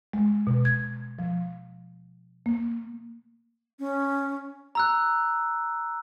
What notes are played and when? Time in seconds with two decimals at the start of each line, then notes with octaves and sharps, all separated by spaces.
0.13 G#3
0.47 B2
0.65 G#6
1.19 F3
2.46 A#3
3.79 C#4
4.75 A#5 E6 F#6